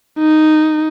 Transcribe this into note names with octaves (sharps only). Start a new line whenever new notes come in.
D#4